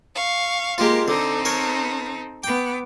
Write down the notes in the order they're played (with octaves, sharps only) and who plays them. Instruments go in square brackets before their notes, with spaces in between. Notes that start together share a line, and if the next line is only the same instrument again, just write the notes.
[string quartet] F5 C#6
[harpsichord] G#3 F4 [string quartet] A#3 G4 A#4
[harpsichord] D3 [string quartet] C4 D#4 A4
[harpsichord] A#4 C#5
[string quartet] B3 D6 [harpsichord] G5